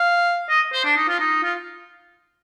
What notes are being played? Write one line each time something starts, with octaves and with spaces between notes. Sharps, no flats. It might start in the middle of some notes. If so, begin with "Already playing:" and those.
Already playing: F5
D#5
C5
D4
D#4
F4
D#4
F4